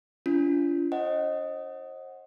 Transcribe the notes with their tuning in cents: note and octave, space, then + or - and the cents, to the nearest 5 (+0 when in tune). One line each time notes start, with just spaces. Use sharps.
D4 -45 F4 -35
C5 +40 D#5 +0 F#5 +0